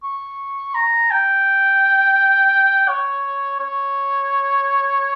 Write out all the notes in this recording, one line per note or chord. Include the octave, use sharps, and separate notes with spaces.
C#6
A#5
G5
C#5
C#5